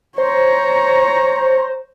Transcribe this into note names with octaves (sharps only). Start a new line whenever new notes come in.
C5 C#5 A#5